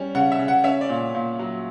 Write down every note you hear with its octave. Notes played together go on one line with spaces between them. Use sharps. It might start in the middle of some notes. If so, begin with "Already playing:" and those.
Already playing: G3 C#4
C#3 F#5
E5
C#3
F#5
C#4 E5
D5
A#2
A#2
F#3